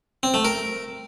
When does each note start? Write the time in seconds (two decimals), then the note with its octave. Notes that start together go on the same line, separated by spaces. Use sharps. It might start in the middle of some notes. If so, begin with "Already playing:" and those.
0.23 C4
0.34 A3
0.45 A#4